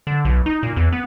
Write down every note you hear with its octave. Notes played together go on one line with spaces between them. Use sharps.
D3
B1
D#4
A#2
E2
B3